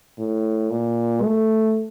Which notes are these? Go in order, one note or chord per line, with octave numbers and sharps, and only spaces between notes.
A2
A#2
A3